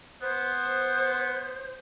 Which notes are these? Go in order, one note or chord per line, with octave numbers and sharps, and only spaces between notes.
B3 C5